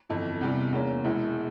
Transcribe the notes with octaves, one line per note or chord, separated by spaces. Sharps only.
G1 F2 E3
E2 C3 E3 G3
E2 E3 A#3 C#4
E1 E2 E3 G#3 E4